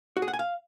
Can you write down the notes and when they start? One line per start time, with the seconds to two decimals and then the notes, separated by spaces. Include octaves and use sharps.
0.17 F#4
0.22 G#4
0.28 F#5
0.34 G#5
0.39 F5